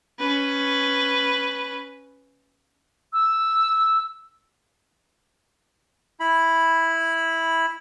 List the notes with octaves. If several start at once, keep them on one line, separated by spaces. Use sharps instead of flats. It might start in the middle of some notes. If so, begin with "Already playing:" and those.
C#4 B4
E6
E4 B5